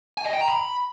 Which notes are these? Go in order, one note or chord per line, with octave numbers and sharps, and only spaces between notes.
G#5
D#5
G5
A#5
B5